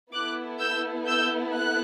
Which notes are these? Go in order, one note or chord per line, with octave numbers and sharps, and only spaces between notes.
B3 E4 A4 D6 F#6
E6 G6
E6 G6
F#6